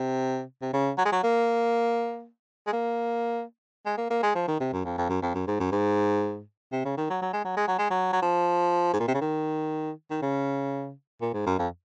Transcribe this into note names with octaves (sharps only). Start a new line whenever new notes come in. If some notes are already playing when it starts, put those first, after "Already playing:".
Already playing: C3
C3
C#3
F#3
G#3
F#3
A#3
G#3
A#3
G#3
A#3
A#3
G#3
F3
D#3
C3
F#2
F2
F2
F#2
F2
F#2
G#2
F#2
G#2
C3
C#3
D#3
F#3
F#3
G#3
F#3
G#3
F#3
G#3
F#3
F#3
F3
G#2
A#2
C3
C#3
D#3
D#3
C#3
A#2
G#2
F#2
F2